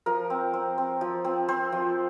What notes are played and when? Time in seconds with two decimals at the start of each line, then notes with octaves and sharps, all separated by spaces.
0.06 F3 A#4
0.30 C4
0.54 C4
0.78 C4
1.01 F3
1.25 C4
1.48 C4 C5
1.72 F3